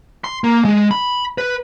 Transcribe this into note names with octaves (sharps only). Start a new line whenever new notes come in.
C6
A#3
G#3
B5
B4